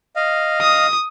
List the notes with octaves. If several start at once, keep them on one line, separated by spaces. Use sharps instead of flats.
D#5 F5
D#6